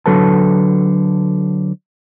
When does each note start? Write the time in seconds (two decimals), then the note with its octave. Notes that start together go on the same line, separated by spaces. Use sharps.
0.06 D3 F#3 A4 B4 A5